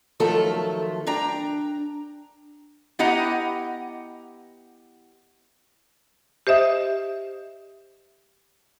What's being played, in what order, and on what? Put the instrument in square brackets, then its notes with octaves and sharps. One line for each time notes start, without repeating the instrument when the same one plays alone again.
[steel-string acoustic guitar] D#3 F3 F#3 A3 F4 A4
D4 G5 A#5
[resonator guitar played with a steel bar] B3 E4 G4 D#5 F#5 A#5
[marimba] G4 C5 D#5 E5 D#6